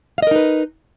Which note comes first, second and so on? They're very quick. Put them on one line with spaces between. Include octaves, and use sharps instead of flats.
F5 D#5 A#4 D#4 B4